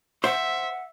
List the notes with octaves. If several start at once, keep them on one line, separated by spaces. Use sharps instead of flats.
C5 E5 F#5